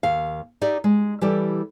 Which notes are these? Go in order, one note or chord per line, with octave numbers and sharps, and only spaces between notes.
D#2 F5
D#4 G4 D5 E5
G#3
E3 G3 E4 G4 A4